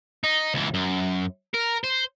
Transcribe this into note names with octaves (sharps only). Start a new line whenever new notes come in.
D#4
C#2 E3
F#2
A#4
C5